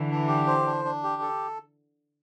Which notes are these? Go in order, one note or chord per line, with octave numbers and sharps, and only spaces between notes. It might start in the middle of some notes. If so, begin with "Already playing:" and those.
Already playing: D3 E3
D4
G4
C5
D4
D4
G4
A4